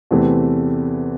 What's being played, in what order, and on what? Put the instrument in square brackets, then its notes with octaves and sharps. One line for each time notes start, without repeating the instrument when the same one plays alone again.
[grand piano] E2 C3 E3 A3 C4